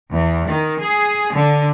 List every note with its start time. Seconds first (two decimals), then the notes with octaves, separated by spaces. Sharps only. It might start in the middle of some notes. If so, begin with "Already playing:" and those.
0.12 E2
0.47 D#3
0.81 G#4
1.34 D3